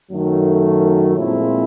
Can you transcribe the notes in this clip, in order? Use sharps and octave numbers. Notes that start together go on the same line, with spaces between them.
F#2 D#3 F#3 A3
A#2 F3 G#3 C4 E4